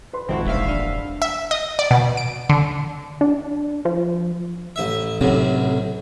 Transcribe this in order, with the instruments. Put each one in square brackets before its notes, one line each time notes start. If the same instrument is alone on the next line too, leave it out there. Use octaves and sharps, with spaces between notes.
[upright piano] B4 C6
[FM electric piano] A1 C3 G#3 [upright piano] F2 D#3 [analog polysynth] C4 E4 F#4
[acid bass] E1 [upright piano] G2 [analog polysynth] A#3 E5 F5
[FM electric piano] D4 B5
[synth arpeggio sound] E5
D#5
D5
B2
D7
D3
[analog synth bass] D4
F3
[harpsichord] A1 E5
[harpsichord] B1 F#2 A2 [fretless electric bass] C3